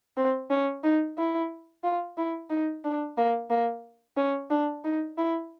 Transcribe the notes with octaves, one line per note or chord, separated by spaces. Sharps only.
C4
C#4
D#4
E4
F4
E4
D#4
D4
A#3
A#3
C#4
D4
D#4
E4